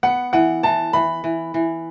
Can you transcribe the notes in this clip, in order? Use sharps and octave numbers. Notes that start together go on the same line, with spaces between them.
B3 F#5
E3 F#5
E3 A5
E3 B5
E3
E3